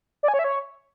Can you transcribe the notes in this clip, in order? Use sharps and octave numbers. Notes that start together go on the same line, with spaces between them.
D5
G#5
C#5
E5
C#5